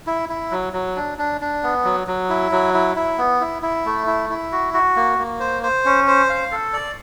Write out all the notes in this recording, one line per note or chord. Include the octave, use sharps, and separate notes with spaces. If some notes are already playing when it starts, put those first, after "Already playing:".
E4
E4
F#3
F#3
D4
D4
D4
B3
F#3
F#3
E4
F#3
E4
E4
B3
E4
E4
A3
E4
E4
F#4
F#4
A#3
A#3
C5
C5
C#4
C5
F5
A4
D5